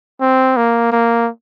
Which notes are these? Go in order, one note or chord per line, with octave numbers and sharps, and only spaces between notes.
C4
A#3
A#3